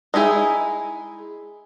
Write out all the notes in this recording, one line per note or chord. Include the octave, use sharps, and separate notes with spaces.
G#3 D#4 E4 G#4